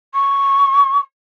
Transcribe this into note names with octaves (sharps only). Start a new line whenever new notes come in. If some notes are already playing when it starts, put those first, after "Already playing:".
C#6